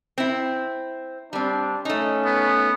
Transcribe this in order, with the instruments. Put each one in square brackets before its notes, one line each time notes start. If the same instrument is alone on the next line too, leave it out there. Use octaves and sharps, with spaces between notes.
[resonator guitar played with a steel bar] C4 E4
[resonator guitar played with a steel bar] G3 C4 [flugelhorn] D4
[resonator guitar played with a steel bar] A3 D#4 [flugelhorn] C#4
[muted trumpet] B3